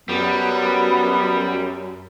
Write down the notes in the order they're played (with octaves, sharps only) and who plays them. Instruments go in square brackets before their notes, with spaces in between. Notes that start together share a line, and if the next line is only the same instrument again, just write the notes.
[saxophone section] F#2 [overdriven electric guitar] G3 [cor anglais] B3